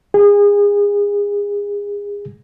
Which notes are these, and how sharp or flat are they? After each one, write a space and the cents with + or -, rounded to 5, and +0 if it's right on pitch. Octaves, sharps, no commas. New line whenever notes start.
G#4 -30